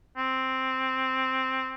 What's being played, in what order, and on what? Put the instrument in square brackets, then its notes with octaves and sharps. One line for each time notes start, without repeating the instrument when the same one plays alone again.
[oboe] C4